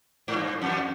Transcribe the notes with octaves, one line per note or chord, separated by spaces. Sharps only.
G#2
G2
F2